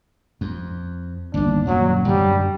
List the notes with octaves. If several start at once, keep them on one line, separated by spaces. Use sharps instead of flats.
F2
G1 D#2 D4
D#1 F#2 F#3 A#3
F#2 D3 G3